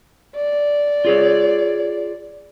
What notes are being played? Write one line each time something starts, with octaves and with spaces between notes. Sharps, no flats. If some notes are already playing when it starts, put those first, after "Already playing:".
D5
F4 G#4 C#5